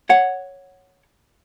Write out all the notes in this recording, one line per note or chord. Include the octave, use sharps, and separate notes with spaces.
C#5 F#5